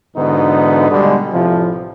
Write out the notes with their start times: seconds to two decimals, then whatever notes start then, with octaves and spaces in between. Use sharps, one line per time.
0.16 G#2 B2 D3 E3 B3 D#4
0.91 B2 D3 G3 G#3
1.33 A1 A2 C3 F3